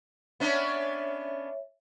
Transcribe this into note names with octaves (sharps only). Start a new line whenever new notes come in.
B3 C#4 D4 C#5 E5